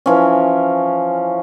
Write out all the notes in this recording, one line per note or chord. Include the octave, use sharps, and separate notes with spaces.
E3 F3 C#4